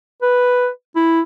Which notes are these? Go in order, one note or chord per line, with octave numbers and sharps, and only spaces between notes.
B4
E4